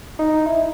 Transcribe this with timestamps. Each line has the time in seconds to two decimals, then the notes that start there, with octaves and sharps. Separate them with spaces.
0.19 D#4
0.46 E4